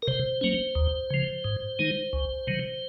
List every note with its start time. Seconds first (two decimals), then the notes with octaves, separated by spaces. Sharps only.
0.02 A#4
0.08 C3 C5
0.41 F#3 A#3 C#4
0.75 D#2
1.10 C#3 F3
1.44 G#2
1.79 D#3 G#3 D#4
2.13 C#2
2.47 C3 D#3 F#3